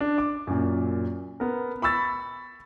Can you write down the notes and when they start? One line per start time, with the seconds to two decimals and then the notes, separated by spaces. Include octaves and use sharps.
0.01 D4
0.18 D6
0.47 F#2 A#2
1.40 B3 A#4
1.82 B5 C#6 E6 A6